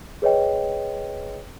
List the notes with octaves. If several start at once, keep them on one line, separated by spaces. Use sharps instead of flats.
G#4 B4 C#5 D#5 G5